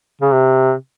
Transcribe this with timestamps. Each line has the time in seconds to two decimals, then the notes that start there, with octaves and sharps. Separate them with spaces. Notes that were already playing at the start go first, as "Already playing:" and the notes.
0.21 C#3
0.31 C3